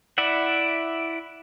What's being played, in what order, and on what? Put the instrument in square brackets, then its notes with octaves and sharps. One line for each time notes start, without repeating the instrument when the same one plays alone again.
[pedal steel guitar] E4 D5 E5 F#5